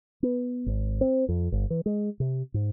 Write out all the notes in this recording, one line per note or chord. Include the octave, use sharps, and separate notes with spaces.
B3
G#1
C4
F2
G1
E3
G#3
C3
G#2